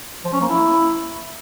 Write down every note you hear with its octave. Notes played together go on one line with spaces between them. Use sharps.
F3
C#4
A#3
E4